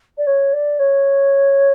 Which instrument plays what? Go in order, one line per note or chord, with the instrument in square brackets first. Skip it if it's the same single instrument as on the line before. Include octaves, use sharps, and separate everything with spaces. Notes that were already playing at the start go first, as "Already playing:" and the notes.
[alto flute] D5
C#5
D5
C#5